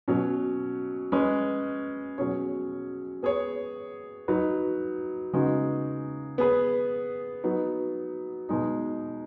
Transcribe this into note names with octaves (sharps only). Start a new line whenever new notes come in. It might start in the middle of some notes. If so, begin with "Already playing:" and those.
B2 F#3 C#4
G#3 C#4 B4
B2 F#3 C#4 G#4 C#5
B3 G#4 C#5
F#3 D#4 B4
C#3 G#3 B3 D#4 F#4
B3 G#4 B4
F#3 B3 D#4
B2 G#3 D#4